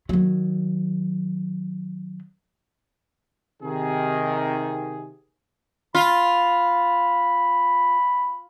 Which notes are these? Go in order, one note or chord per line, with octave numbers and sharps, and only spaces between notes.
D#3 F#3
C3 D#3 G#4
F4 B5